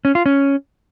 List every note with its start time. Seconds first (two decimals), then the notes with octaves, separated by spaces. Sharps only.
0.05 C#4
0.15 F4
0.26 C#4